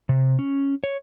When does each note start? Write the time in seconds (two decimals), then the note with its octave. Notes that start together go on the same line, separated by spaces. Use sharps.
0.09 C3
0.39 C#4
0.84 C#5